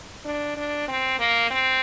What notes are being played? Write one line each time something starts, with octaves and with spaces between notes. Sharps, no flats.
D4
D4
C4
A#3
C4